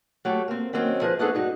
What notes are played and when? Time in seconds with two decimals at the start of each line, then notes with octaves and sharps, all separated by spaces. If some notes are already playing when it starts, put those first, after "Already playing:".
0.25 F#3 A3 G4 A4
0.48 A#3 C4
0.73 D#3 F#3 A#3 C4 C#4
1.01 F3 G#4 B4 D#5
1.19 A3 B3 D4 D#4 G#4 A4
1.35 G2 D#4 F#4